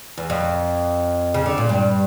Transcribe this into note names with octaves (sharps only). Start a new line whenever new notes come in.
E2
F2
C#3
D3
A#2
G2